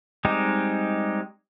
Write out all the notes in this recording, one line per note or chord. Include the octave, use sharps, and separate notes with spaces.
G3 G#3 C4 D#4 G4